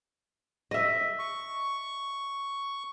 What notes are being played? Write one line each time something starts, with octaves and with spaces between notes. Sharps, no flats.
D#5 E5
C#6